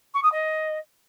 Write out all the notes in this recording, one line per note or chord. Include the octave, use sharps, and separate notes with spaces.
C#6
D#6
D#5